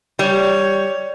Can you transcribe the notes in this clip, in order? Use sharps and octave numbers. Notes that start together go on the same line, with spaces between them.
G3 C#5